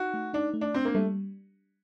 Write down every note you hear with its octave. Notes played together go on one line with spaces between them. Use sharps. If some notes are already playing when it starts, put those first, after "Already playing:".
Already playing: D#4 F#4
A3
D4 D#4
A3
D4
C4 D4
A#3
G3 A3